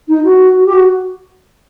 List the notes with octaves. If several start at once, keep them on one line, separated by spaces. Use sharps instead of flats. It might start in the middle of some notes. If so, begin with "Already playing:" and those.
D#4
F#4
F#4
G4
F#4